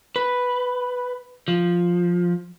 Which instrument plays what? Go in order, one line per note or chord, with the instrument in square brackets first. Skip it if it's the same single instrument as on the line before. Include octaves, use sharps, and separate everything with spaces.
[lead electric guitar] B4
F3